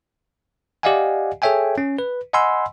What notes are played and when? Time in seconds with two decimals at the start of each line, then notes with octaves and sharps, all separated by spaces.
0.83 G4 D5 D#5 F5 F#5 G#5
1.42 G#4 A4 C#5 E5 G5 G#5
1.78 C#4
1.99 B4
2.33 D#5 F#5 G#5 B5 C6 E6